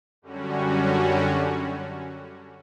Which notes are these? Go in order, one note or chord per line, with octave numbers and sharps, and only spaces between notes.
F#2 D3 G3 C#4 F#4